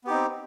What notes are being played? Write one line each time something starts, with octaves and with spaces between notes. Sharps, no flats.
B3 C4 D#4 G4